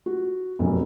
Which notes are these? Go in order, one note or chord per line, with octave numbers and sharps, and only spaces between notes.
F#4
F1 B1 F#2